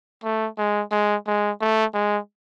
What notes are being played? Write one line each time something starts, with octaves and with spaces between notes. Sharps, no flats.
A3
G#3
G#3
G#3
A3
G#3